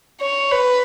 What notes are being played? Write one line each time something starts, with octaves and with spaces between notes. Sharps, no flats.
C#5
B4